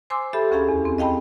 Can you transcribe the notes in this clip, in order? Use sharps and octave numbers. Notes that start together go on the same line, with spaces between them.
C5 G#5 C6 D6 E6
G4 A4 E5 B5
D2 C#4 G#4 F5 A#5 B5
E2
C4
D#5 F5 G5 A5 B5